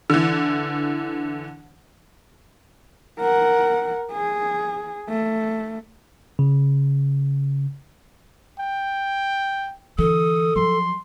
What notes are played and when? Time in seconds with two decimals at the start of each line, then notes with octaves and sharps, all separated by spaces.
0.10 D3 E3
3.19 A#4 F#5
4.12 G#4
5.09 A3
6.39 C#3
8.59 G5
9.98 D3 E3 A4 D#6
10.56 F3 F#3 C6